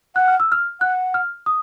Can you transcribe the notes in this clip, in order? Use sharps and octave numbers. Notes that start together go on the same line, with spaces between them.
F#5 F#6
F6
E6
F6
F#5 F#6
F6
D#6